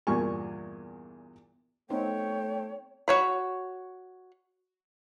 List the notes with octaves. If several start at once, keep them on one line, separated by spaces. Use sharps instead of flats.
E2 G2 A#2 A#4 G#5 C#6
A3 B3 C4 D#4 C#5 G5
F#4 C#5 B5